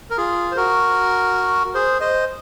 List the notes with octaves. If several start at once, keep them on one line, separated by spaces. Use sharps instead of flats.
A#4
F4 G#4
C5
F#4 A#4
G#4 C5
C5 D#5